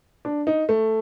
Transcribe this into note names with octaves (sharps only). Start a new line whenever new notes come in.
D4
D#4
A3